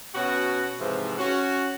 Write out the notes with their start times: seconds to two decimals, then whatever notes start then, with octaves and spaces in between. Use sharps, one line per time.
0.15 B2 C#4 F#4
0.80 G#2 C3 E3 F3 G#3
1.19 C#4 F#4